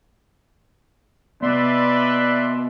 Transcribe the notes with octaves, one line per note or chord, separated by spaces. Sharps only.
C3 B3 B4 D5 E5 C6